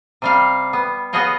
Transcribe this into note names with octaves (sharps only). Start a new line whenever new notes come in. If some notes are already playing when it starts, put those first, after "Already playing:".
C3 G3 F5
B3
B3 F#4 G#4 C#5 D#5 F5